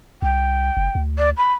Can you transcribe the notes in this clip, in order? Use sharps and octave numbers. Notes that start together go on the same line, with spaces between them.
C2 G5
F#1
D2
D5
B5